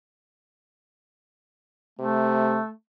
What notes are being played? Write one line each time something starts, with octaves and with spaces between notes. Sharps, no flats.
C3 A3